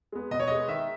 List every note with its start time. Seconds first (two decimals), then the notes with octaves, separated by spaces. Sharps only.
0.12 G#3 B3
0.31 B2 D#5
0.40 C#5
0.48 G#3 B3 D#5
0.68 D#3 E5